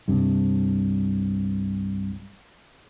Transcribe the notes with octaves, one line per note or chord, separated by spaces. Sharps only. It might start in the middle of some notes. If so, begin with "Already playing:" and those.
C2 G2